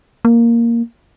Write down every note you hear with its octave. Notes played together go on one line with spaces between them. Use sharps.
A#3